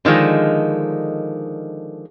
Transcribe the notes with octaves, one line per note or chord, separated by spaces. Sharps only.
D3 D#3 F3 G#3